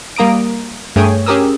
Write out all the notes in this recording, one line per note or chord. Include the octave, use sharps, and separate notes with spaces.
G3 A#3 A#5 D#6 D7
G2 A3 G#4 C#5 G5 G#5
C#4 G4 G#4 A#4 D#6 E6